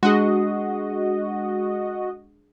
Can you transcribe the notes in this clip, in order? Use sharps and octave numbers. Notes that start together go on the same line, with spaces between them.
G#3 D4 F#4 G#4 D#5